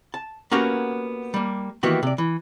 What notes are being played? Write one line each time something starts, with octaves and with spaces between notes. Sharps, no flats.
A5
A#3 B3 C#4 F#4 G4 A#4
G3 A#3
D#3 E3 A#3 B3 F#4 G4
C3 D5
E3